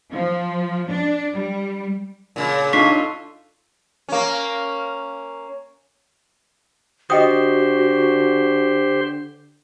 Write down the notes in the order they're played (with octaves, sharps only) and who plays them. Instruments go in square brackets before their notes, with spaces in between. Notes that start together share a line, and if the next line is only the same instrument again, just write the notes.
[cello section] F3
D4
G3
[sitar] A#2 C#3
[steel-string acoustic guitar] D4 D#4 [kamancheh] F4 A4 [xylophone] C#6 B6 C7
[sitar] A#3 C#4
[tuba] D3 [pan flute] F#4 [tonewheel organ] G4 C5 [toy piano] D#5 G5 D#6